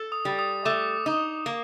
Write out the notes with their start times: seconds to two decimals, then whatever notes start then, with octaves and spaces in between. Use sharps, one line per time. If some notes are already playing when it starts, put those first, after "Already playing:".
Already playing: A4
0.12 D#6
0.25 G3
0.39 D#6
0.65 A3 D6
1.06 D#4
1.46 A#3